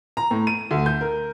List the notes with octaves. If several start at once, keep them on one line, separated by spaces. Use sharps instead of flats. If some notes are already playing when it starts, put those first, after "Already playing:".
A#5
A2
D#7
D2
G6
A#4